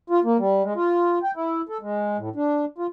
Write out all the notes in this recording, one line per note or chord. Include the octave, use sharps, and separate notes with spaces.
F4
A#3
G3
G#3
F4
G5
E4
A4
G#3
A2
D4
F4